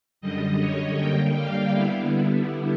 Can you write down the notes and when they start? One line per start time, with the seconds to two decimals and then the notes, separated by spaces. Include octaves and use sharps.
0.21 F#2 D3 G3 D#5
0.60 C#5
0.98 D3 G3 A#3 G5
1.36 F5
1.74 D3 G3 B3 E4